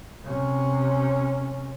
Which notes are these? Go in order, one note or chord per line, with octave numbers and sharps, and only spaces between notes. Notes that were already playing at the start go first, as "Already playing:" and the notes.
C3 C#4